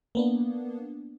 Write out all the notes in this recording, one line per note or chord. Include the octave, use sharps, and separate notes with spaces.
A#3 B3 D4